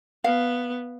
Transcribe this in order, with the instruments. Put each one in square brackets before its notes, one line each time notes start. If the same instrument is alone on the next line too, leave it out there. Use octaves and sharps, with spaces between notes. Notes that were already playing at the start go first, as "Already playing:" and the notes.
[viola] B3 [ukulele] F5